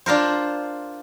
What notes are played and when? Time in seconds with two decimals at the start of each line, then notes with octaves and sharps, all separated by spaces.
0.06 D4 F4 A#4 C5